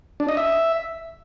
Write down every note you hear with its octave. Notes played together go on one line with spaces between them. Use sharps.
D4
D#5
E5